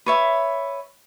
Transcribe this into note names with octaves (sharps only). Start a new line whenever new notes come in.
B4 C#5 E5